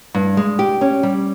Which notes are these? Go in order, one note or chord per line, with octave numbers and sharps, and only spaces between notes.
G2
G#3
G4
C#4
G3